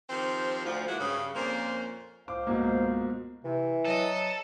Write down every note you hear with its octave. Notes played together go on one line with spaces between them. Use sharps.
D#3 F3 C4 G4 C5
D2 F3
E3 F#3 G#3 A#3 E4 F#4
G2 C#3
F2 A#2 A#3 C#4 C5
C#2 C5 F5 D6
G#2 B2 A#3
C3 E3
F#3 A4 D#5